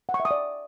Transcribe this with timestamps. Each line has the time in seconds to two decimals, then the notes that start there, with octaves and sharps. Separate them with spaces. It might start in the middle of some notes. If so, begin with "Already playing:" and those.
0.09 F#5
0.14 C#6
0.20 E5
0.25 D#6
0.31 D5